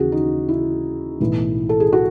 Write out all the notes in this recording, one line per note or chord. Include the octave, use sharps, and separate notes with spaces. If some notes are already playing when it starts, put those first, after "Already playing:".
Already playing: D#2 C#3 E3 F#4 G#4
D#4
E4
B1 A2 E3
A4
G#4
F#4